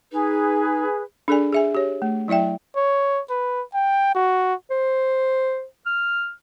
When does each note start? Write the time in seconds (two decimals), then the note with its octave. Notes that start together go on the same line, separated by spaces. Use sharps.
0.12 D#4 G#4 B4
1.28 D4 G#4 A4 D5 G#5
1.52 G#4 E5 G#5
1.75 G4 C#5
2.02 A3
2.28 F#3 E4 D5 E5 G5
2.76 C#5
3.30 B4
3.74 G5
4.15 F#4
4.71 C5
5.86 F6